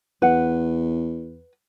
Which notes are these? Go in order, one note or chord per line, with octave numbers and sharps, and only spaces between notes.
E2 B4 F#5